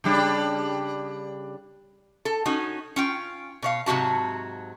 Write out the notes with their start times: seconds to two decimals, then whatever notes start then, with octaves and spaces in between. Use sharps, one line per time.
0.04 C#3 G3 D4
2.25 A4
2.45 C#4 D#4 F#4
2.96 C#4 F4 G5
3.62 B2 C#5 F5
3.86 G#2 C3 F#3 F#4 A5